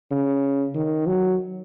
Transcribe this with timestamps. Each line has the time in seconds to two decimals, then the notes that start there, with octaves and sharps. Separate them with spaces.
0.11 C#3
0.75 D#3
1.07 F#3